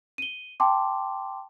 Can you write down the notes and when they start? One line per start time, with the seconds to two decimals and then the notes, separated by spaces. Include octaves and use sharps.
0.18 D#7 G7
0.60 G5 A5 C6 D6